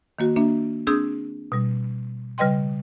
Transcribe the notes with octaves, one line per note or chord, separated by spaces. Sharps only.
D#3 A#3 F#4
A#3 D4 E5
C4 D4 G#4 D#6 E6 G6
B2 G3
C#3 G3 B4 D#5 G5 C6